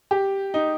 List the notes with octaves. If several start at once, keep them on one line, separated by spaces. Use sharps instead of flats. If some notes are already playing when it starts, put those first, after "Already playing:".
G4
D#4